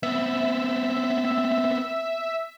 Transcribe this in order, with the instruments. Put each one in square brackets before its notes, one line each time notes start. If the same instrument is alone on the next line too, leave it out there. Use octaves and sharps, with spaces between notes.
[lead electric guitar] B3 C4 [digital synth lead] E5